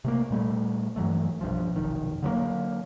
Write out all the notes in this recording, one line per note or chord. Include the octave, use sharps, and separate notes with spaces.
C3 A3 A#3
A#2 G3 A3
G2 E3 F#3 A3
B1 G2 F3
F1 B1 D#3
D3 F#3 G3 A#3